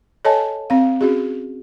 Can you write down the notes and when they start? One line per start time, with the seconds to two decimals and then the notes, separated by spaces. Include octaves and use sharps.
0.25 A4 C#5 D#5 G#5 A5
0.70 C4 F5
1.01 C#4 F#4 G#4